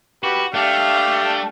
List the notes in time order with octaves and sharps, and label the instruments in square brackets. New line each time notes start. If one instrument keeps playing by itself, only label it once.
[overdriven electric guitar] F#4 [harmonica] G4 B4
[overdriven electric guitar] A3 [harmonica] D4 G4 G5 [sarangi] F5